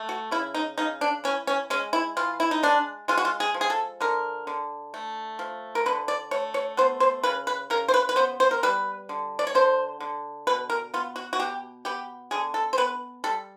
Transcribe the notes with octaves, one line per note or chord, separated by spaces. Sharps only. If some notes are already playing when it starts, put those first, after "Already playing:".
Already playing: A3
F#4
C#3 E4
D#4
C#3 D#4
D4
E3 C#4
C#4
G#3 C#4
E4
E3 F4
E4
D#4
G#3 D4
G#3 F4
F#4
F4
G#4
F3
G#4
A4
D3 A#4
D3
A3
F3
A#4
D3 B4
D5
A3 C#5
C#5
B3 C5
C5
C#3 B4
B4
C#3 A#4
C5
B4
B4
B3 C5
C5
A#4
G3 B4
D3
D5
C#5
D3 C5
D3
B2 B4
A#4
B3 F4
F#4
F#4
B2 G4
B3 G4
D3 G#4
A4
C5
B3 B4
G3 A4